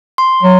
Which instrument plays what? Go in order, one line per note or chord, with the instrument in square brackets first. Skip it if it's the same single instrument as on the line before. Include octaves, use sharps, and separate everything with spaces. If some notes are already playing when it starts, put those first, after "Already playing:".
[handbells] C6
[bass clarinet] F#3